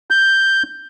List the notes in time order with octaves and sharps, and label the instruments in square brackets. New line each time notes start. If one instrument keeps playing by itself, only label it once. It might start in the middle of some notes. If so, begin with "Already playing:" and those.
[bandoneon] G6